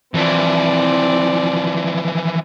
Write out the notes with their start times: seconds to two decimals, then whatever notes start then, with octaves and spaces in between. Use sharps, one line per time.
0.14 E3 F3 C4 D5